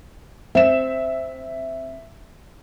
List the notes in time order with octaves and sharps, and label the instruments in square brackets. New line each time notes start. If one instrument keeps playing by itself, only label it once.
[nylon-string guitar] C4 [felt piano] E5 E7